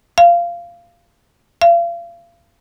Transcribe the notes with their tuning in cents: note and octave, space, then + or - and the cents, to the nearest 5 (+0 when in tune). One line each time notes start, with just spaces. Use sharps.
F5 -15
F5 -35